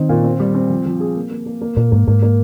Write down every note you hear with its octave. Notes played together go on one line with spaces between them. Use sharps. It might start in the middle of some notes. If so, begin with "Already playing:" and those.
Already playing: D#3 C4 D#4
A#2
C4
G3
C4
F3
F3
G#4
A#3
A#3
A#3
A#3
A#2 A#3
G#2 A#3
G#2 A#3
A#3